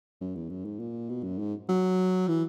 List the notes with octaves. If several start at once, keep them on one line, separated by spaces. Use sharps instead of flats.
F#2
E2
F#2
G#2
A#2
B2
F#2
G#2
F#3
E3